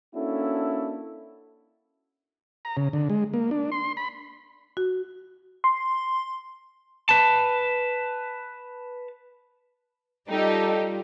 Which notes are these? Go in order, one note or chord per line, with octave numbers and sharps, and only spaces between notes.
A#3 C#4 D4 E4 F#4 A4
A#5
C#3
D3
G#3
A#3
D4
C6
B5
F#4
C6
B4 A5
G3 D#4 F4 G4 A4